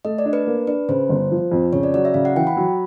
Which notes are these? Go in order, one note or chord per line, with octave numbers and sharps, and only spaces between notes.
A3 D#5
D5
D4
B4
A#3
D4 B4
C#3 C5
G1
F3
F2
C#3 C#5
D5
F#3 D5
E5
C#3 F5
F#5
E3 G5
B5
F#3